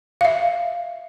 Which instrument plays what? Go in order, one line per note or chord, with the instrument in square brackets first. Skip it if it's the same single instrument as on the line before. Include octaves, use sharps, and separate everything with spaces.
[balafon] E5 F5